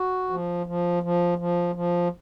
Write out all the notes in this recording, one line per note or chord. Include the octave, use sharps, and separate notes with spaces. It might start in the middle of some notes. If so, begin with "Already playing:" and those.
Already playing: F#4
F3
F3
F3
F3
F3